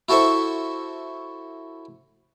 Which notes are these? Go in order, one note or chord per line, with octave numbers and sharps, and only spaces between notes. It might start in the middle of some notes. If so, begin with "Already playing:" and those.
E4 F#4 A4 C5 E5 C#6